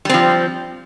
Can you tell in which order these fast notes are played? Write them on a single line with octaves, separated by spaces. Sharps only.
G3 C4 F3